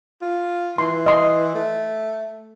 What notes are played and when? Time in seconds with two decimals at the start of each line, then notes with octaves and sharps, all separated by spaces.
0.21 F4
0.78 E3 C6
1.06 D#5 C6
1.55 A3